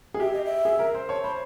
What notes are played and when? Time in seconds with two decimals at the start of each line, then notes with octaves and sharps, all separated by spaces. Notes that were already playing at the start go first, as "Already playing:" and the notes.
0.14 G#4
0.20 G4 E5
0.33 D#5
0.45 E5
0.65 G#4
0.79 A#4
0.95 C5
1.09 C#5 A5
1.24 C5 B5